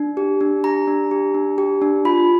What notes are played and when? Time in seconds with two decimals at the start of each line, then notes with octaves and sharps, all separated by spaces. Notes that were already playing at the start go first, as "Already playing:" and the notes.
Already playing: D4
0.17 G4
0.41 D4
0.64 G4 A#5
0.87 D4
1.11 G4
1.34 D4
1.58 G4
1.82 D4
2.05 F4 B5